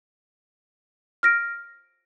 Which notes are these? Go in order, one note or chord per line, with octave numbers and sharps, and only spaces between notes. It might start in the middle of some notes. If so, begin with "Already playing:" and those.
F6 A#6 D7